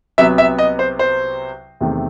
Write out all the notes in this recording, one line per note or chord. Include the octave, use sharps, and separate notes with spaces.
C2 C3 F#3 B3 E5
E5
D#5
C5
C5
E2 C3 D#3 A3 C4